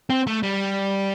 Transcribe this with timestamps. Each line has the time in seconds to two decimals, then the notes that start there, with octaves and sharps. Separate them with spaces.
0.10 C4
0.27 A3
0.43 G3